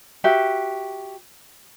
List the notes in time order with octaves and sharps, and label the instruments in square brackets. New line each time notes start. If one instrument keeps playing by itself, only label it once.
[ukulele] F#4 G4 E5